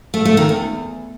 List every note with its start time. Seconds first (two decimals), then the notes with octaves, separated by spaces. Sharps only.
0.14 A3
0.25 A3
0.37 D#3
0.49 E2